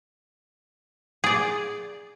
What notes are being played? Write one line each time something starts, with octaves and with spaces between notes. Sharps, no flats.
G#4 D5